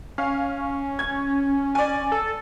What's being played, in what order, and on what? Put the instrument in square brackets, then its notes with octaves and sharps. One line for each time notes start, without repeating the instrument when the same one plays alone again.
[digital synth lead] C#4 [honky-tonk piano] F5
[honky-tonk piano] G#6
D5 G#5
[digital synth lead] A4